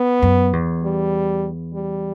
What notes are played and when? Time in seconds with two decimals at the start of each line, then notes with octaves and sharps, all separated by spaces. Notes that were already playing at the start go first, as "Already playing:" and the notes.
Already playing: B3
0.22 F#2
0.53 E2
0.83 G3
1.74 G3